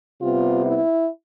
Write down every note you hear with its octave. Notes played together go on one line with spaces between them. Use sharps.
C3 G3 B3 F4
E4